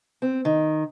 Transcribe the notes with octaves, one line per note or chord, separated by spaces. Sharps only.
C4
D#3